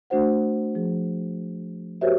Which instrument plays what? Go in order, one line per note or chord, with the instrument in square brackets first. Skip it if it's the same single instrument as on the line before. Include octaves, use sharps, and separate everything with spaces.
[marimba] A3 D4 F#4 C5 F#5
F3 G#4
F#4 G4 A#4 C5 C#5 E5